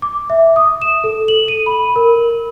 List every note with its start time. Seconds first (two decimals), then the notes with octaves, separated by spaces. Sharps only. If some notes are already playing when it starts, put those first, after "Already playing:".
0.02 D6
0.30 E5
0.56 D#6
0.82 E7
1.04 A4
1.28 F#7
1.48 D#7
1.66 B5
1.96 A#4